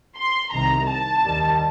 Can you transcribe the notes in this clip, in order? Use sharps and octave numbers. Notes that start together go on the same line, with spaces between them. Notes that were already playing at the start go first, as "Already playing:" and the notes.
C6
C2 C3 D#3 A#5
A5
D#2 D#3 G3